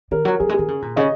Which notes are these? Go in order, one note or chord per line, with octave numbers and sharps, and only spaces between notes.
D#3 A#4
F#3
F#3 G#4
G#3
D#3 G#4
C#3
A#2
C#3 D#5